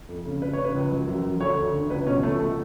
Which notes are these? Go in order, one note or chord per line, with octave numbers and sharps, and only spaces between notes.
F2
C#3
C#3 B4
C#3 C#5
B4
C#2
F#2
F#2
F#2
D2 C#5
D2
D3
C#2 B4
B2 C#4
C#2 A3
A3